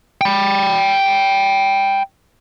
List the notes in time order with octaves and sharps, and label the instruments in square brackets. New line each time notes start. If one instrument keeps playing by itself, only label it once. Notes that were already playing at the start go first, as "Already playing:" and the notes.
[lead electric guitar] G5 B5